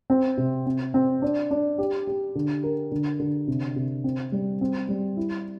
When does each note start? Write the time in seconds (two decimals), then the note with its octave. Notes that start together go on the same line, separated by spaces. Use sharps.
0.10 C4
0.37 C3
0.66 C4
0.94 C4
1.22 D4
1.51 D4
1.78 G4
2.07 G4
2.35 D3
2.64 A#4
2.91 D3
3.19 D3
3.48 C3
3.76 C3
4.04 C4
4.32 G3
4.61 C4
4.89 G3
5.17 E4